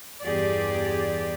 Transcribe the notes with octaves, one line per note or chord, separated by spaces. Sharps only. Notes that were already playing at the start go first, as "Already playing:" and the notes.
E2 G2 G4 G#4 D5